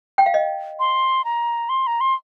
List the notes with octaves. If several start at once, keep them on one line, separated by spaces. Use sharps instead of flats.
G5
F5
D#5
C6
A#5
C6
A#5
C6